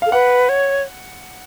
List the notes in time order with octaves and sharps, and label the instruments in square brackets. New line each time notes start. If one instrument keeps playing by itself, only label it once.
[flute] A4 [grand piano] F5
[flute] B4 [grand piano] F#5
[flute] C#5